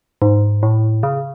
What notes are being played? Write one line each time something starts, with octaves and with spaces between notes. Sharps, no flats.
G#2
A2
C#3